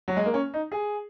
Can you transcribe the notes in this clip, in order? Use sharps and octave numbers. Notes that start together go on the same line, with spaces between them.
F#3
G#3
A#3
C#4
D#4
G#4